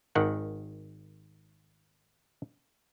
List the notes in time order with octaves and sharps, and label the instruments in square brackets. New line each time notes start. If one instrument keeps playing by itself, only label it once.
[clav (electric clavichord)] G#1 D#3 F#5